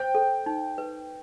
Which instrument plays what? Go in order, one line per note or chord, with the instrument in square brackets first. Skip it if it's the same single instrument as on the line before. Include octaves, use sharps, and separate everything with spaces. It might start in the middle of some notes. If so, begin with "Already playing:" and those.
Already playing: [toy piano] C5 [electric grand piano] G5
[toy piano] A4
D#4
B4